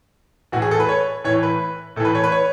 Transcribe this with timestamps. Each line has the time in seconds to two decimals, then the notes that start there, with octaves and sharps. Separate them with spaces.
0.52 A2 E3 F#4
0.62 G#4
0.71 A4
0.80 B4
0.89 C#5
1.24 A2 E3 C#5
1.43 B4
1.96 A2 A4
2.00 E3 B4
2.15 C#5
2.24 B4
2.32 C#5